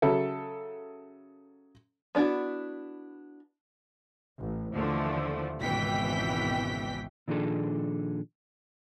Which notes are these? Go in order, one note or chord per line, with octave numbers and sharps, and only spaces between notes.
C#3 F#3 A4 E5
B3 D4 E4 F#4
A1
D#2 D3 E3 F3 A3
G#1 C#2 B2 E3 G5 B6
A#2 D#3 F3 D4 G#4 A4